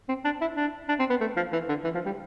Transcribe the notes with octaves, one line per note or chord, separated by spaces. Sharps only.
C4
D4
E4
D4
D4
C4
B3
A3
F3
E3
D3
E3
F3
G3